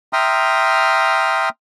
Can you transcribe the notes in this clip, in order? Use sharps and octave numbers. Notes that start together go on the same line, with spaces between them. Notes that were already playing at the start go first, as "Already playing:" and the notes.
E5 G5 A#5 C6 D#6 F6